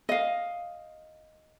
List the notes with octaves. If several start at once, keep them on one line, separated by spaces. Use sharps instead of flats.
D#5 F5